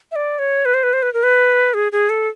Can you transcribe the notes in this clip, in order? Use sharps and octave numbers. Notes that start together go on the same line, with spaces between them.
E5
D5
C#5
B4
C5
B4
C5
B4
A#4
B4
G#4
G#4
A4